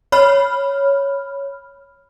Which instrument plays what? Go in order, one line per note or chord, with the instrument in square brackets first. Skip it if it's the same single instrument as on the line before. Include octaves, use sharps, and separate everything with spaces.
[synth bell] C#5 B5 F6